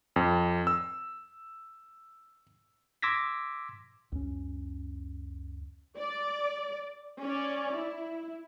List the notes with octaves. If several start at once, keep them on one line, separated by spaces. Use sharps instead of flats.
F2
E6
C6 D6 E6 G#6 A#6 B6
C#2 F#2 C#4
D5
C#4 D5
E4